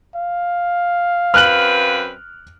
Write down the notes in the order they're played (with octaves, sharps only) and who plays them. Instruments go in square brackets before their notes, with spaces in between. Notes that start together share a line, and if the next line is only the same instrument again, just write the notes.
[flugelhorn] F5
[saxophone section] F#2 C4 B4 [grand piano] F6 F#6 F#7